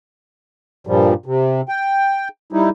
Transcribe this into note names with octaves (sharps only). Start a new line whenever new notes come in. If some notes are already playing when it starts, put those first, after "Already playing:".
G2 A#2 F3 G3
C3
G5
G3 D#4 E4